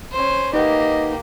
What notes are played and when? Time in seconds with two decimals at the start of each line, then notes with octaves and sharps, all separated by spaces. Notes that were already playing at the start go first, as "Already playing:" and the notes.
0.11 C#4 C5
0.53 A#3 D#4 G4 B4 D#5 F#5